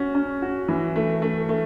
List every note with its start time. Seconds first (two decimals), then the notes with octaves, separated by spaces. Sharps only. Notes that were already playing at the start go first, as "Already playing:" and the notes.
Already playing: C#4 F#4
0.15 C#4
0.42 F#4
0.68 E3
0.96 A3
1.22 A3
1.49 A3